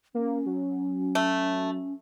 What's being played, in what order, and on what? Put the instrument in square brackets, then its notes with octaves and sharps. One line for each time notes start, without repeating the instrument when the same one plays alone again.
[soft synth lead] A#3 [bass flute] C#4
[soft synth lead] F#3
[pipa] A3